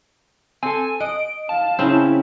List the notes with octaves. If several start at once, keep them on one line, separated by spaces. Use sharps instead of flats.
C4 A4 G#5
D#5 F#5 D7
F5 A5
C#3 C4 C#4 E4